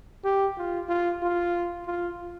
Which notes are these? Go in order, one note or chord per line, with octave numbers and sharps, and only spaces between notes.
G4
F4
F4
F4
F4